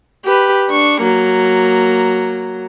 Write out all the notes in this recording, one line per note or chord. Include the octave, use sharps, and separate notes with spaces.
G4 B4
D4 C#6
F#3 A#3